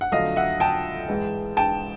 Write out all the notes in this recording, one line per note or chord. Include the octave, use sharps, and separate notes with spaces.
F#5
F2 D3 F#3 A3 D#5 F5
E5 F#5
G5 A5
G#2 E3 G#3
G5 A5